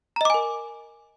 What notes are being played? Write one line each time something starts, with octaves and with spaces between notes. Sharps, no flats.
A#4 D#5 G#5 A#5 D6